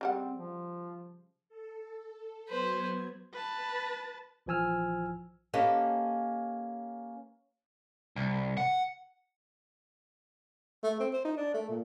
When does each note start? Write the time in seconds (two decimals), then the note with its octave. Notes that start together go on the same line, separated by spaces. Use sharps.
0.01 C#3 G3 C4 F#5
0.36 F3
1.49 A4
2.48 F#3 B3 B4 C5 G#6
3.33 B4 A5
4.46 A#1 E3 F3 G#5 E6 F6
5.53 A#3 C#4 G4 A4 B4 D#5
8.16 C2
8.57 F#5
10.83 A3
11.00 C4
11.13 C5
11.25 D#4
11.37 D4
11.54 A3
11.69 A#2